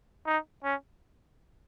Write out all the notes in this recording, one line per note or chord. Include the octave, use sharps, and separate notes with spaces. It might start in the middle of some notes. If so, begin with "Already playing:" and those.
D#4
C#4